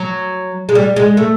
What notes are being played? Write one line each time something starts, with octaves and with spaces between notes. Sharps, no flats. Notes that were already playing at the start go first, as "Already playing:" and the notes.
Already playing: F#3
G#3
G3
G#3
A3